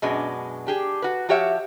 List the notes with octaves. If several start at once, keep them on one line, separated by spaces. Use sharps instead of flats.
F#2 B2 G#3 D4
D4 G4 G#4
F#4 B4
F3 F#4 G4 C#5 E5